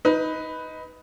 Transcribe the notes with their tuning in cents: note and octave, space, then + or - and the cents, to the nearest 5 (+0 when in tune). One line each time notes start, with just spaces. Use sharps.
D#4 +15 B4 +0